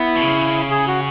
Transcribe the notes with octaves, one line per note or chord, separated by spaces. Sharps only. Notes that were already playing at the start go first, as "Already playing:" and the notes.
Already playing: B3 E4
B2
C#3
G#4
F#4